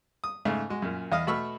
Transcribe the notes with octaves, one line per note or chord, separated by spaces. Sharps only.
D#6
G#2 C#3 A3
G#3 F#4
F#2 A#2
E2 D#5 F5 D#6
B2 A3 B5 C#6 E6 F6